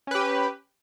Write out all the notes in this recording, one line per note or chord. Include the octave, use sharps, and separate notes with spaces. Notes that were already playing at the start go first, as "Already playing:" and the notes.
C#4 G4 B4